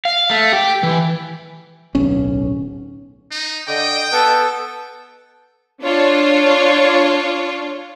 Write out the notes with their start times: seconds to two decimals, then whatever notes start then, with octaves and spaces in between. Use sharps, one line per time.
0.05 F5
0.30 A3
0.53 G4
0.83 E3
1.95 D1 B1 C#4
3.31 D#4
3.68 D3 D#5 G5
4.12 B3 A4
5.82 D4 F4 C#5